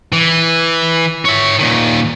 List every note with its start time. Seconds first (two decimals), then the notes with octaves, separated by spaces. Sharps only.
0.12 E3
1.25 C#5 E5
1.59 A#2 D#3